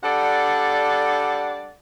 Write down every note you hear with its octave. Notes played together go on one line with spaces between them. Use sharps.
G3 D4 A4 D5 F#5